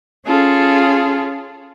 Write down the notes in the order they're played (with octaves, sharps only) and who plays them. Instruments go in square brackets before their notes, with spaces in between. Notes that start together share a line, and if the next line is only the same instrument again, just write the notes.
[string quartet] C#4 F4 G#4 A4